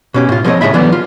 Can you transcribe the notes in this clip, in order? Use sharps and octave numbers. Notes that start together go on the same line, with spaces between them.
B2 C#4 G4
A2 F4
F3 G#3 C4 B4 C#5 D#5
A2 C#3 G#3 E5 B5
D3 E3 F#3 G3 B3
F4